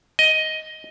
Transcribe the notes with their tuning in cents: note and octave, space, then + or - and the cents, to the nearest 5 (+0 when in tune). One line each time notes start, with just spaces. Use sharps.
D#5 +10